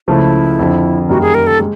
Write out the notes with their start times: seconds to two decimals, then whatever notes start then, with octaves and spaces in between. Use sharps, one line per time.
0.08 C#2 C#3 F3 A3 E4
0.59 F2 D3 F3
1.09 F#2 D#3 G3 A#3 F#4
1.22 G#4
1.34 A#4
1.47 A4
1.60 G#3